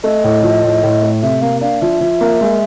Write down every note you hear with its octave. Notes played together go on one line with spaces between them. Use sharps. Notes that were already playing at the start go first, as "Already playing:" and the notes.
A3 D#5
A2
F3
A2
A2
A3
C3 E5
A#3 F5
D4 F5
F3 E5
F3
A#3
G#3